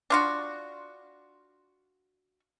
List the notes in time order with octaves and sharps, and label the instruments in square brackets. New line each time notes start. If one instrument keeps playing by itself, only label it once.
[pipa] D4 F4 F#4